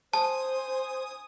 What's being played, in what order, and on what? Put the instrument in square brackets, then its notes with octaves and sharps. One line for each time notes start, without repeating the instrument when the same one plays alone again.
[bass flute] C5 [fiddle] G#5 D#6 [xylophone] A5